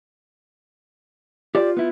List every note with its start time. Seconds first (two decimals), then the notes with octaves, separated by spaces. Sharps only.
1.55 F4 G4 C5 D5
1.77 B3 E4